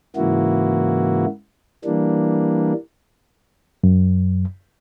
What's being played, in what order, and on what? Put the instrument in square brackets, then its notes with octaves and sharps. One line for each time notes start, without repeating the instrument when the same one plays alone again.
[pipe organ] G#2 C#3 E3 A#3 E4 F#4
E3 G3 A#3 D4
[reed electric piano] F#2